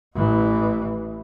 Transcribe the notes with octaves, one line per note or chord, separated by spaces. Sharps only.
A1 E3